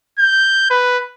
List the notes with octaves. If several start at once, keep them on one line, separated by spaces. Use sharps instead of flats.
G6
B4